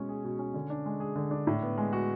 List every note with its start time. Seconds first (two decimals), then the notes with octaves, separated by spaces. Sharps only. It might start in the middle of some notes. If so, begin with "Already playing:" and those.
Already playing: B2 G#3 C#4
0.09 G#4
0.24 B2
0.39 C#4
0.54 D3
0.70 D4
0.86 G#3
1.00 G#4
1.16 D3
1.31 D4
1.47 A2
1.63 B3
1.78 G#3
1.93 F#4